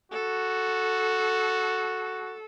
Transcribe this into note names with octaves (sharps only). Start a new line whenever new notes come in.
F#4 A4